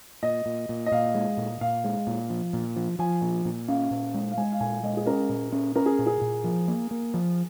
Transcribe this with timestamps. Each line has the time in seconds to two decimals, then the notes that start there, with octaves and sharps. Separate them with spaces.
0.23 A#2 D#5
0.46 A#2
0.69 A#2
0.86 D#5
0.92 A#2 F5
1.15 G#3
1.37 A#2
1.61 A#2 F5
1.84 G#3
2.07 A#2
2.30 F3
2.53 A#2
2.76 F3
2.99 F3 G#5
3.22 A#2
3.45 A#2
3.68 C#4 F5
3.91 A#2
4.14 G#3
4.32 F5
4.37 G#3 G#5
4.52 F5
4.60 A#2 G#5
4.83 G#3 D#5
4.97 G#4
5.06 C#4 A#4
5.29 A#2
5.52 C#4
5.76 C#4 A#4
5.86 G#4
5.99 A#2
6.06 G#4
6.21 A#2
6.44 F3
6.68 A#3
6.91 A#3
7.14 F3